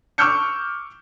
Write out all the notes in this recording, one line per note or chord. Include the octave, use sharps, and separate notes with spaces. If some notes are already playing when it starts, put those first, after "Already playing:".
C#6 D6 E6 F6 G6 C#7